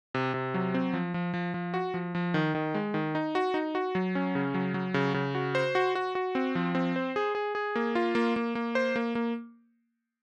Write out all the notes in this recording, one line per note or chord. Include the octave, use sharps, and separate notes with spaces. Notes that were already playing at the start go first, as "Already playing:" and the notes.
C3
C3
F#3
C4
F3
F3
F3
F3
F#4
F3
F3
D#3
D#3
G#3
D#3
D#4
F#4
D#4
F#4
F#3
C#4
C#3
F#3
F#3
C#3
C#3
F#4
C5
F#4
F#4
F#4
C4
F3
C4
C5
G#4
G#4
G#4
A#3
F4
A#3
A#3
A#3
C5
A#3
A#3